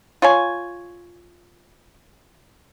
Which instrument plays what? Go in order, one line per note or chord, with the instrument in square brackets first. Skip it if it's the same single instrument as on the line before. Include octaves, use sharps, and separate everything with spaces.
[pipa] F4 C#5 G#5